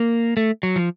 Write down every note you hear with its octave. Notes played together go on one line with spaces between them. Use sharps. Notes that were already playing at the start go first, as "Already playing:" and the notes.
Already playing: A#3
A3
F#3
F3